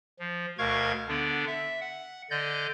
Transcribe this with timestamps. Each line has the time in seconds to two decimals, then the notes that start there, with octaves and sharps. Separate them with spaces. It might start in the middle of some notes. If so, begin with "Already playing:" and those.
0.19 F3
0.58 D2 B2 A#4 F5 C#6 G#6
1.08 D3 B3 D4
1.47 E5
1.81 F#5
2.31 D3 D5 D#5 G6